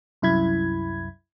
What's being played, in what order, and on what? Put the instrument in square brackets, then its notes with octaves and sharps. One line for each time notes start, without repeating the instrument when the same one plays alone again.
[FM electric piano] C2 F#2 E4 B5 G#6